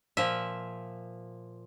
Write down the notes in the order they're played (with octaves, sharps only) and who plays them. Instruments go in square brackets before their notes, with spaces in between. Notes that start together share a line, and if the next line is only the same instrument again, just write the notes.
[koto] A#2 F3 E5